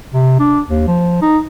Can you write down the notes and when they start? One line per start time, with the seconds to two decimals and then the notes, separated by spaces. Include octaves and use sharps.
0.14 C3
0.40 D4
0.67 D#2
0.87 F3
1.22 D#4